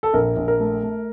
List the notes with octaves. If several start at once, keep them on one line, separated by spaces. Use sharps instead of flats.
A4
A#1 A#4
A#1
A#4
A3
A3